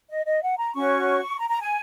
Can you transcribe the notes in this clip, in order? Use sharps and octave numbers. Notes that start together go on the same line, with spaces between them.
D#5
D#5
F#5
A#5
C#4 F#4 C#5 C#6
A#5
A#5
G#5